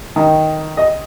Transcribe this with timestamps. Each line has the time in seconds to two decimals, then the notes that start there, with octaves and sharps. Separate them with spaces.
0.16 D#3
0.77 D#5